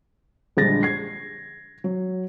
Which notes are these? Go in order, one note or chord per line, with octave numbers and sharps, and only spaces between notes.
A#1 D3 G3 G#3 A6 A#6
G#6 C7
F#3